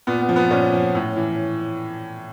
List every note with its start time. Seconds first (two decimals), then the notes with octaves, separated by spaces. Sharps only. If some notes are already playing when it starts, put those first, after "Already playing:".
0.07 A#2 B3
0.22 B3
0.29 F3
0.36 B3
0.51 A#2 C#4
0.73 F3
0.95 A2
1.16 E3